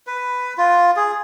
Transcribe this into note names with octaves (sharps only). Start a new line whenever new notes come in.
B4
F4
G#4